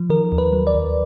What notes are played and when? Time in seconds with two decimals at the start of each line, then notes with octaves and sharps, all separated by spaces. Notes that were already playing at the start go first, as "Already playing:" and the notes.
Already playing: F3
0.10 D#3 A#4
0.32 D#2
0.38 B4
0.53 F#3
0.67 D5
0.75 D#2